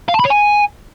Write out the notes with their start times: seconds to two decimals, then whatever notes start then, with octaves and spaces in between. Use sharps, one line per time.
0.09 F5
0.14 A5
0.20 B5
0.25 C#5
0.30 G#5